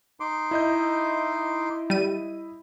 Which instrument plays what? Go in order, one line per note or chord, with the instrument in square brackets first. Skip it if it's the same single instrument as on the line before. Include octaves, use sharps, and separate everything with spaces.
[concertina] D#4 C6 D6
[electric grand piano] E4 D#5 G6
[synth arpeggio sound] G3 D#7